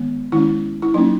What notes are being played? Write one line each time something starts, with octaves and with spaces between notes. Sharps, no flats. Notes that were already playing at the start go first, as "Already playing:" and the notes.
Already playing: D#3 G#3 B3
D#3 G#3 C#4 E4
E4
F#3 A#3 C#4 D#4